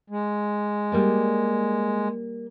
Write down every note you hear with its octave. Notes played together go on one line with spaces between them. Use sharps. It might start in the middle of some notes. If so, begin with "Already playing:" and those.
G#3
G3 A#3 D5